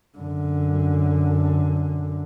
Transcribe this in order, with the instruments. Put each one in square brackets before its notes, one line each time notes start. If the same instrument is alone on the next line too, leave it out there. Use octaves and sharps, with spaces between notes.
[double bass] F#2 D3